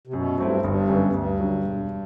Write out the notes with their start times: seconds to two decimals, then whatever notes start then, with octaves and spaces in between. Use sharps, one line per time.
0.07 C3
0.13 F#2 B2
0.38 G2 F#3 A3 C4 E4
0.63 G1 G2
0.89 F#2 D3 G3 B3
1.14 D2 G2
1.40 D3 F#3
1.65 E1